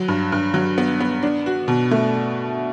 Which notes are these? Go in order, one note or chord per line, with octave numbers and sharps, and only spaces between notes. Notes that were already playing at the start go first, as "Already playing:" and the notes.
Already playing: F#3
G2
G2
F#3
B3
B3
D4
F#4
B2
A3